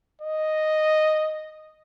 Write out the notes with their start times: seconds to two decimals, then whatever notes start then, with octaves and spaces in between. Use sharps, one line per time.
0.22 D#5